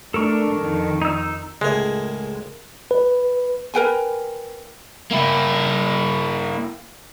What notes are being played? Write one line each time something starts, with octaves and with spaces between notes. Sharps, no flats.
A3 D4 A4 A#4 C#6
F2 D#3
D#4 E6
C#2 A2 G#3 G#4 A#4
B4
A#4 B4 G5 G#5
A#3 E4